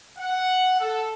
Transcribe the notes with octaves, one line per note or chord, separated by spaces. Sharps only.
F#5
A4